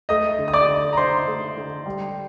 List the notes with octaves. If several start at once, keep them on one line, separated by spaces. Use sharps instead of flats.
A3 D#5 D#6
D3
D#6
D5 D6
D3
A#5
D4 C5 C6
A3
D3
G3